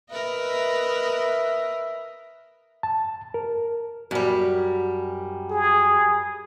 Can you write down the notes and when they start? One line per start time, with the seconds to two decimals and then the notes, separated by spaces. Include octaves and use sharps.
0.11 A#4 B4 D#5 E5
2.83 A5
3.34 A#4
4.11 F#2 G3
5.51 G#4